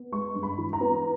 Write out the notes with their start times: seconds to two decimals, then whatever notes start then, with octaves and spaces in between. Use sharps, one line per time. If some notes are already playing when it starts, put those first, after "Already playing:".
Already playing: B3
0.12 G#3 C#6
0.35 G2
0.43 B5
0.58 E3
0.73 A#5
0.81 B3